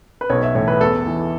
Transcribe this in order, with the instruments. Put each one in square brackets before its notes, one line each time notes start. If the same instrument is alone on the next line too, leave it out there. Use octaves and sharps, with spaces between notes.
[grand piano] B4
B1 C#5
E5
A2 E3 C#5
B4
E2 A4
E3